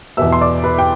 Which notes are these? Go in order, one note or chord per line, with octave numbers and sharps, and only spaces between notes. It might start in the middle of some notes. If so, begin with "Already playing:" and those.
E2 B2 B3 E5 E6
C6
D5 D6
B4 B5
G5